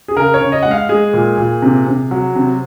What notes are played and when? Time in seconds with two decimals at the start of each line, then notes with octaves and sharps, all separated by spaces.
0.08 G#4
0.16 C#3 A#4
0.34 C#5
0.41 C#3
0.52 D#5
0.63 G#3 F#5
0.71 F5
0.89 G#3 G#4
1.13 A#2
1.37 A#2
1.62 C3
1.87 C3
2.11 F#3
2.35 C3